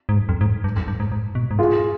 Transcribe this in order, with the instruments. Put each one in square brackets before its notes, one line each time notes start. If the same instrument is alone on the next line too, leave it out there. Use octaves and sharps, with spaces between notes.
[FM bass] G#2
G2
F2
G#2
G2
F2
G2
G#2
G#2
B2
G#2
[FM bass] G2 [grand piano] F4 G#4